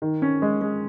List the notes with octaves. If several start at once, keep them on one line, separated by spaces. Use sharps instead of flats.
D#3
C#4
G#3
G#3